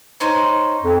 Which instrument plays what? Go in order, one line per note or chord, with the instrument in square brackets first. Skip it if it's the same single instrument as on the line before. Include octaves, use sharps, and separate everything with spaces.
[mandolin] C#4 D#4 C5
[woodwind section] F2